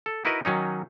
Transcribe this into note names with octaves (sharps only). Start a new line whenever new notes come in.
A4
D#4 E4 F#4 A#4 B4 D#5
D#3 F#3 C#4 D#4